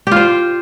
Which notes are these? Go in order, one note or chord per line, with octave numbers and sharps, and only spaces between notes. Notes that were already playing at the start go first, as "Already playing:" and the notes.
F4 G4 C5